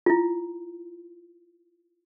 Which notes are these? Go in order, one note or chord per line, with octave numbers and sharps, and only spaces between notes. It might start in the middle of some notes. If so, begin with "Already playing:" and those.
E4 F4